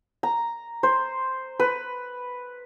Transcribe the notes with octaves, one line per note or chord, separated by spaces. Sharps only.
A#5
C5
B4